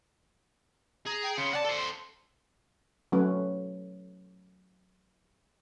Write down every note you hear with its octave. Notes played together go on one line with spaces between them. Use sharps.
G#4 A#5
G5
C#3 C6 C#7
D5 F#5 A5
A4 C5
C6
F#3 A3 C#4 B4